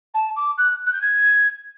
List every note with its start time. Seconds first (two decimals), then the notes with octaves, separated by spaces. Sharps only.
0.14 A5
0.36 D6
0.58 F#6
0.86 F#6
0.93 G6
1.01 G#6